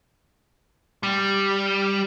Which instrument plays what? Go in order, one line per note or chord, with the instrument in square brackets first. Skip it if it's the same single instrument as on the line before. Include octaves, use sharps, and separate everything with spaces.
[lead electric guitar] G3